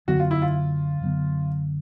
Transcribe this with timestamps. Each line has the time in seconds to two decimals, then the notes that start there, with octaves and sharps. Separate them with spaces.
0.08 F#2 D3 F#3 B3 F#4
0.20 F4
0.31 E4
0.42 F4
1.01 F#2 D3 F#3 B3